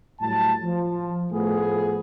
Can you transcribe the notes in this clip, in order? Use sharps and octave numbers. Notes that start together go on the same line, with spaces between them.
A2 F#3 G3 A5
F3
A2 F3 A3 B3 G#4